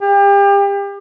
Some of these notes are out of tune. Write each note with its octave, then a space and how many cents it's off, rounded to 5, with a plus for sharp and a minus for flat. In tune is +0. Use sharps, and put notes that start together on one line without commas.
G4 +35